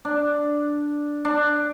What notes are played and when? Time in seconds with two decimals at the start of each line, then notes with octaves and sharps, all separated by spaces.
0.05 D4
1.25 D4